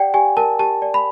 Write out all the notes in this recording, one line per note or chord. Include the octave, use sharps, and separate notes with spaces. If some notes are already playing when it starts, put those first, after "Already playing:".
Already playing: G4 D5 F#5 G5
G4 G#5
A#4 A5
G4 A5
D5
B5